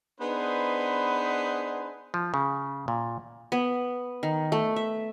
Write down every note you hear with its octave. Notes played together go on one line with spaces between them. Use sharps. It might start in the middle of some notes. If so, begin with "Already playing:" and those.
B3 D4 D#4 G#4 B4 C5
F3
C#3
A#2
B3
D#3
A3
E5